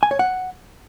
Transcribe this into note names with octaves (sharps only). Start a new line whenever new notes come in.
G#5
C#5
F#5